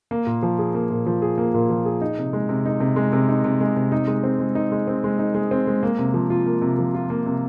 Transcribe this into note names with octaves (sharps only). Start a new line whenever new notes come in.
A#3
A#2
F3
G#4
A#3
A#2
F3
G#4
A#3
A#2
F3
G#4
D#4
C3
G#3
C3
D#4
C3
G#3
C3
D#4
C3
G#3
C3
D#4
G#3
C4
G#3
D#4
G#3
C4
G#3
D#4
G#3
C4
G#3
A#3
C3
F3
F4
A#3
C3
F3
F4
A#3
C3